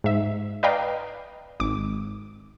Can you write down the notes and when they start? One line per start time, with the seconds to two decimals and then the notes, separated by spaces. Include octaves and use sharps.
0.04 G#2 E5
0.63 B4 D5 D#5 F5 G5 A#5
1.60 G#1 D6